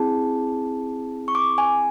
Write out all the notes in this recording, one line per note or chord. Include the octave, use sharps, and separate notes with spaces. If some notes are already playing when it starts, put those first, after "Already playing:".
Already playing: C4 E4 G#4 A5
C#6
D6
G#5